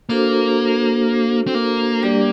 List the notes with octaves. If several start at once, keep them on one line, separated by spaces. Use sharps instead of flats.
A#3 D4 F#4 A4 C5
C4
A#3
G3 D4 G4 D5